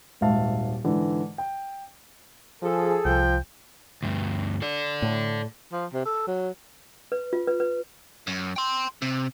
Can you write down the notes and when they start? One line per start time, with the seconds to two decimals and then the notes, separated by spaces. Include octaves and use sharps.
0.21 D#1 G#1 G#2 E5 F5 A5
0.84 G#2 D3 E3
1.38 G5
2.62 F3 G#4 A4
3.05 C2 F3 G5
4.03 D2 G2
4.62 A4 D5
5.02 A2
5.72 F3
5.93 C3
6.05 A4
6.27 F#3
7.12 B4
7.33 F4
7.47 B4
7.60 B4
8.27 F#2
8.56 G5 C6
9.02 C3